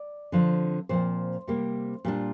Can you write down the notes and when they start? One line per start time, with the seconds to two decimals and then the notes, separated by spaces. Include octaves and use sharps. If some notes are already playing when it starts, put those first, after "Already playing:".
Already playing: D5
0.32 D3 F3 C4
0.89 A#2 F3 C4 C5
1.47 C3 G3 A#3
2.05 A#2 G3 D4